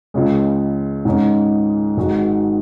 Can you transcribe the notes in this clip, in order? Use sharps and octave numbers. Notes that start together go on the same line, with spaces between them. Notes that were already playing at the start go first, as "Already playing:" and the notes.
C#2 C#3 G#3
G#2 D#3 G#3 C#4
G#1 G#2 D#3 G#3 F#4